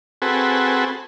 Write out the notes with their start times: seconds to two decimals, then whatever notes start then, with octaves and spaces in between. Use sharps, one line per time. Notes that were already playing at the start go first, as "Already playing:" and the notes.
0.22 C4 F#4 G#4 A4 B4